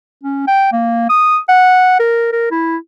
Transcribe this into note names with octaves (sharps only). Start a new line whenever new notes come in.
C#4
G5
A#3
D#6
F#5
A#4
A#4
E4